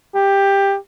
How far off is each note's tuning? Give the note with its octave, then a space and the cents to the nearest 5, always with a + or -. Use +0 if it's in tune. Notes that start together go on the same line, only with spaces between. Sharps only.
G4 +10